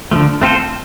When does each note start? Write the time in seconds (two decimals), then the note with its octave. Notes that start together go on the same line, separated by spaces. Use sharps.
0.11 D3 F3 A3
0.42 A3 C4 F4 A4 C5